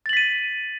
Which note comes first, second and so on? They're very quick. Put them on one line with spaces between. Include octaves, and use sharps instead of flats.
A6 F#7 B6 D#7